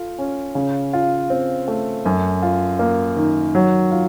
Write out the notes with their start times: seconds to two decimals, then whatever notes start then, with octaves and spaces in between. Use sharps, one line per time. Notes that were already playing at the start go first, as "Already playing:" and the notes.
Already playing: F4 A4
0.18 C#4
0.55 C#3
0.93 F4
1.30 C4
1.68 A3
2.05 F#2
2.42 F4
2.79 A#3
3.17 D#3
3.55 F#3
3.91 F4